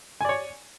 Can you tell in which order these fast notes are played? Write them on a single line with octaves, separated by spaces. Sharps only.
G#5 D5 C#5